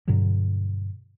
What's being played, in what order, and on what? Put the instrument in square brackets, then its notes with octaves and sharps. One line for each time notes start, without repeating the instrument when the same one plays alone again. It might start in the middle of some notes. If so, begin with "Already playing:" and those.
[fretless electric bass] G2 B2 D3 F#3